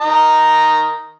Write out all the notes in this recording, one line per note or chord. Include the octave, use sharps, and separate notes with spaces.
D#3 D#5 A#5